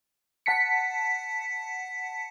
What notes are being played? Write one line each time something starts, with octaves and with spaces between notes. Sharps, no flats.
F#5 A5 B6 C#7